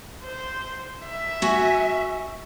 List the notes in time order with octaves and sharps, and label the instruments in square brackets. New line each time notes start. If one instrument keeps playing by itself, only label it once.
[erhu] C5
E5
[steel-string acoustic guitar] F#4 G#5